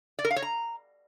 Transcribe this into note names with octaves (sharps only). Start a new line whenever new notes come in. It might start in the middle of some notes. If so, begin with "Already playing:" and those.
D5
A#4
F5
C#5
A#5